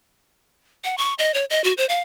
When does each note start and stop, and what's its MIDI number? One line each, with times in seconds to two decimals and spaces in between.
0.84 0.96 78
0.98 1.14 85
1.19 1.34 75
1.34 1.45 73
1.50 1.61 75
1.64 1.73 66
1.77 1.86 72
1.89 2.00 77